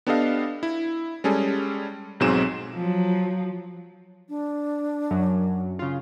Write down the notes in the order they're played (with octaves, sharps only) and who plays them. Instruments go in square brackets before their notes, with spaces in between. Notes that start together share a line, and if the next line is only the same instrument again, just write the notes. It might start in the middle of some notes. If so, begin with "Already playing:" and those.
[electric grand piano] B3 D4 G4 A4 D#5 F5
E4
G3 G#3 C#4 G#4 A4
B1 G#2 F#3 C4 G#4 E7
[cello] F3 F#3
[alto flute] D4
[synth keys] F#2 F#3
C#3 F4